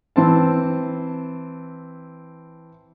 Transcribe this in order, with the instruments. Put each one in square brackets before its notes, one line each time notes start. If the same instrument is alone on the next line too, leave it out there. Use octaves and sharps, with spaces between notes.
[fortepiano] E3 C4 A5